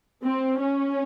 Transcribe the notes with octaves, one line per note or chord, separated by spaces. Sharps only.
C4
C#4